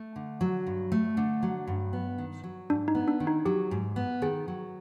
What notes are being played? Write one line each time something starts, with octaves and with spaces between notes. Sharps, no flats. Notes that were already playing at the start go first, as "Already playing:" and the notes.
Already playing: A3
D3
F#3
G2
A3
D3
F#3
G2
B3
D#3
F#3
G#2 D4
D#4
B3
D4
D#3
D#4
F#3 G4
G#2
B3
D#3 G#4
F#3